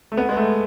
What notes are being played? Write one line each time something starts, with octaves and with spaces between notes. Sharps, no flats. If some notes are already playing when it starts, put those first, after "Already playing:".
A3
B3
G#3
A3